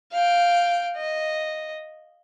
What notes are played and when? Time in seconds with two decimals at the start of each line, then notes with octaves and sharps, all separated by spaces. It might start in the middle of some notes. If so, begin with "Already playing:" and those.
0.12 F5 G5
0.96 D#5